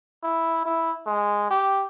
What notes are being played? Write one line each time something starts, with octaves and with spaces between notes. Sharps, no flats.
E4
E4
G#3
G4